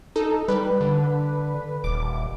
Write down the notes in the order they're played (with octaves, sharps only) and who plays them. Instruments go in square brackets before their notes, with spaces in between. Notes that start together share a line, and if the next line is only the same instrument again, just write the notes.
[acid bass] D#4 [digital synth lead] A4
[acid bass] G3 [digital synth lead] B4
[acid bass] D3
[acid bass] D#1 [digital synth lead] D6